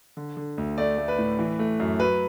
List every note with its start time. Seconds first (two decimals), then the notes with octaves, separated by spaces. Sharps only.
0.17 D3
0.37 D3
0.58 D2
0.78 A3 D5
0.98 A3
1.08 B4
1.18 A2
1.39 E3
1.59 A3
1.80 F#2
2.00 F#3 B4